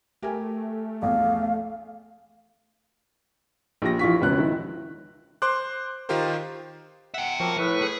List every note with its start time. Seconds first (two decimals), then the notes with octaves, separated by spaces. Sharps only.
0.23 A3 G4 A#4 G#5
1.02 A#1 E2 F5
3.82 A#1 G4 A#6
3.99 A#1 E3 F4 F5 C#6 B6
4.21 E1 C#2 C#4 F#6
4.39 D#3 F3 E4
5.42 C5 C6 D6 F#6
6.09 D#3 F4 G4 A#4 C5
7.14 E5 F#5 G5
7.40 F3 F#3 A#3 C4 C#6
7.58 A2 B4 C#6
7.82 G#4